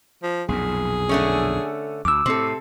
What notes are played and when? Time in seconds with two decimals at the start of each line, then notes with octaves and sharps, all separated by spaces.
0.23 F3
0.49 B1 F2 A#2 G#4
1.09 D3 A3 C#4
2.05 D2 D6 E6
2.26 A2 C3 C4 A4